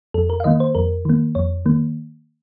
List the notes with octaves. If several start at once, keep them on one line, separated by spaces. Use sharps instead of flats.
F2 A4
A#4
F5
D#3 A#3 D#5
C5
F2 A#4
D#3 A#3
F2 C#5
D#3 A#3